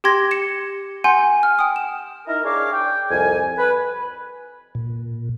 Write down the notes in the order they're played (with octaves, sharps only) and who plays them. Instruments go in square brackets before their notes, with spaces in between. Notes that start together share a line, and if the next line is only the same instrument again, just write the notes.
[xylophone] G4 G5 C6 G#6 A#6
C#7 E7
F#5 G#5 C6 G6
F6
G5 D#6
E7
[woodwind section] D#4 E4 A#4
D4 G#4 C#5 F5 D6
G5
C2 F2 G#5
B4
[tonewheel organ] A#2